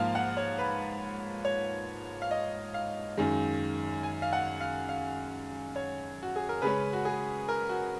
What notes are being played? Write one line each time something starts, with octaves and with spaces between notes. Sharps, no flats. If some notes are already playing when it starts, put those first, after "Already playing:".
Already playing: G#2 F3 A#3 F4 F5
F#5
C#5
B4
C#5
F5
D#5
F5
F#2 D#3 G#3
G#5
F5
F#5
F5
F5
C#5
F#4
G#4
A#4
C#3 G#3 C#4 B4
F#4
G#4
A#4
F#4